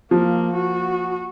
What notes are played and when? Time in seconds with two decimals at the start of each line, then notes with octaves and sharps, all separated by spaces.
0.11 F3 A#3
0.54 F#4